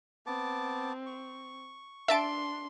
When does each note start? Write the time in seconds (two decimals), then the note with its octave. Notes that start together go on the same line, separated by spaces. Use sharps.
0.27 B3 C4 A5 D6
1.06 C#6
2.08 D4 E5 A5 C6 D7